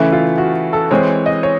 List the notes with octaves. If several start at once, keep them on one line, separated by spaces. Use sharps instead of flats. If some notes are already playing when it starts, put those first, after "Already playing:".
Already playing: C#3 E3 A3 E4
F4
F#4
A4
E3 G#3 C4 C#5
D#5
C#5